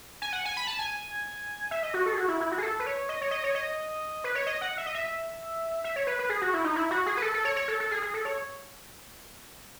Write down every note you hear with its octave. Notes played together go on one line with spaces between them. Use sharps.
G#5
F#5
G#5
B5
A5
G#5
E5
D#5
F#4
A4
G#4
F#4
E4
E4
F#4
G#4
A4
B4
C#5
D#5
C#5
D#5
C#5
D#5
B4
C#5
D#5
F#5
E5
D#5
E5
E5
C#5
B4
B4
G#4
F#4
E4
D#4
E4
F#4
G#4
B4
A4
A4
C#5
C#5
A4
A4
G#4
G#4
A4
C#5